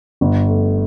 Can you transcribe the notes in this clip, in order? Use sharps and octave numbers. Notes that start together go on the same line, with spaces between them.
G1
A3